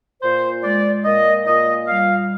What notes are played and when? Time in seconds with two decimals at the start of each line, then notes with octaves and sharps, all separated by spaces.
0.22 A#2 C5
0.64 G#3 D5
1.05 A#2 D#5
1.46 A#2 D#5
1.88 G3 F5